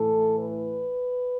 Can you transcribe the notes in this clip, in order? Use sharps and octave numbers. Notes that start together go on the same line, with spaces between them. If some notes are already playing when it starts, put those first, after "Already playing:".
Already playing: A2 E3 A4
B4